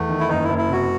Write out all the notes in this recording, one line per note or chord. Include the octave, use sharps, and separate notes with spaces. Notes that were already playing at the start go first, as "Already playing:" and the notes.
Already playing: E2 A3
D#3
E4
F#1 D#4
F#1 E4
E4
C3 F#4